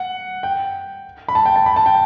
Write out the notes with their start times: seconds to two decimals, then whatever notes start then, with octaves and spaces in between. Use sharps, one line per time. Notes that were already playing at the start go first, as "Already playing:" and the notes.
Already playing: F#5
0.43 G5
1.28 B5
1.35 A5
1.46 G5
1.56 A5
1.66 B5
1.76 A5
1.86 G5